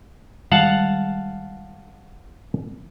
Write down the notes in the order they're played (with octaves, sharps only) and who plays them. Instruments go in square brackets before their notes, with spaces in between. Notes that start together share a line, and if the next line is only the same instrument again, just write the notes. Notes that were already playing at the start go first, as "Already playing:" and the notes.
[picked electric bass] D#3 G3 G#3 [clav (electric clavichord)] F5 F#5 A5